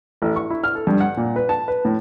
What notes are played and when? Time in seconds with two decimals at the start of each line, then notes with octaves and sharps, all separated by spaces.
0.22 A1
0.36 C#6
0.50 E4
0.64 F6
0.75 A4
0.87 G2
1.01 F#5
1.17 A#2
1.36 B4
1.49 A5
1.68 B4
1.85 A2